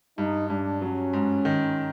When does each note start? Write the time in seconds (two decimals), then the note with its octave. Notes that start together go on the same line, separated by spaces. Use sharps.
0.18 G2 D#4
0.50 G2 D4
0.81 F#3 C#4
1.13 G#2
1.45 D#3